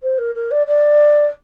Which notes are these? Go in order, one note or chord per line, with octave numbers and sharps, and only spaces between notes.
C5
A#4
A#4
D5
D5